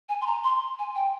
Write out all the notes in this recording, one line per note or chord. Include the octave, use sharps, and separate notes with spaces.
G#5
C6
A#5
C6
G#5
G5